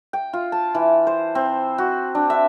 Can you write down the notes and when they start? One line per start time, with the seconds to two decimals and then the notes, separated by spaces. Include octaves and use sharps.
0.13 G5
0.33 F4
0.52 A5
0.75 E3
1.07 C5
1.35 C4
1.78 F#4
2.15 D4
2.30 E5